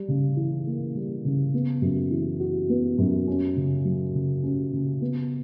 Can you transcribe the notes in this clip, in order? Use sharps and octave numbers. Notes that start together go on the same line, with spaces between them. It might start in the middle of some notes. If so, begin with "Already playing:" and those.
Already playing: G3
C#3
E3
A#3
G3
C#3
B3
F#2
E3
F#4
B3
F#2
C#4
C#3
F#3
C#3
C#4
C#3
B3